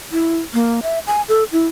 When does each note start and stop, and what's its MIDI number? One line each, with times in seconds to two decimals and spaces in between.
0.12 0.38 64
0.54 0.80 58
0.83 0.99 76
1.07 1.22 80
1.28 1.44 69
1.52 1.67 64